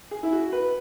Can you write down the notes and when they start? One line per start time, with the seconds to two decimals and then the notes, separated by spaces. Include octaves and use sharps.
0.11 G#4
0.23 E4
0.32 F#4
0.53 B4